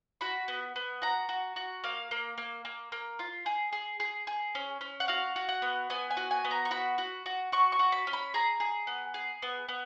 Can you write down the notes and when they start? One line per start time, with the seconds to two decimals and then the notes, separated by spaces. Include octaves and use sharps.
0.21 F#4 B5
0.48 B3
0.76 B3
1.02 F#4 A#5
1.29 F#4
1.56 F#4
1.84 A#3 F5
2.11 A#3
2.38 A#3
2.65 A#3
2.92 A#3
3.19 F4
3.46 G#4
3.73 G#4
4.00 G#4
4.27 G#4
4.55 C#4
4.81 C#4
5.00 F#5
5.08 F#4 F5
5.36 F#4
5.49 F#5
5.62 B3
5.90 B3 G#5
6.11 G#5
6.17 F#4
6.31 G#5
6.45 B3
6.51 A#5
6.65 C#6
6.71 F#4 B5
6.98 F#4
7.26 F#4
7.52 F#4 C#6
7.72 C#6
7.79 F#4
7.92 B5
8.07 C#4
8.13 B5
8.34 G#4 A#5
8.60 G#4
8.87 B3
9.14 G#4
9.42 B3
9.69 B3